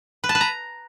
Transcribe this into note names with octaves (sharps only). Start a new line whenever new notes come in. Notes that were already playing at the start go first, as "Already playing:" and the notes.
B4
A5
B4
A#5